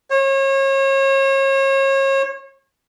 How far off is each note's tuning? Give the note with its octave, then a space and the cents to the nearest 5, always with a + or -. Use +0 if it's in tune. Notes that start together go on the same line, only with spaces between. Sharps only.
C#5 -35